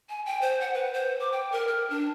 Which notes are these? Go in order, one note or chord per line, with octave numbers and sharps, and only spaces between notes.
G#5
G5
C5
F#5
B4
C5
D6
G5
A#4
F6
D4